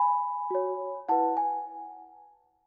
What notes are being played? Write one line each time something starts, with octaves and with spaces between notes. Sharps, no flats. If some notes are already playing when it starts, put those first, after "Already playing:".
Already playing: G#5 B5
F#4 C#5
E4 B4 F#5 A5
G#5